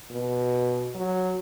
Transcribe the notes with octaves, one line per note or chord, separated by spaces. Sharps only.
B2
F#3